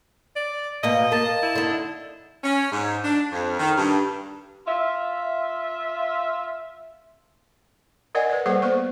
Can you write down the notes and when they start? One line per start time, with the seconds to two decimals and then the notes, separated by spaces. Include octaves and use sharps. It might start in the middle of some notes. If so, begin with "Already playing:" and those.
0.36 D5
0.83 B2 A#3 D#5
1.12 A#3 A5
1.42 E4
1.55 D3 D#4
2.44 C#4
2.72 G#2
3.04 D4
3.31 F2
3.59 D#3
3.78 G2
4.66 F4 E5
8.15 A#4 D5 D#5 F#5 G#5
8.30 B4 D5
8.46 G3 A#3 G#4 A4 C5 F#5
8.62 B3 C5 C#6